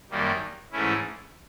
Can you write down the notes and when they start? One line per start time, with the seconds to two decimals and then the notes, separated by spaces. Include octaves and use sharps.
0.10 F#2 D#3 G3 A#3
0.72 G#2 E3 A3 C#4 E4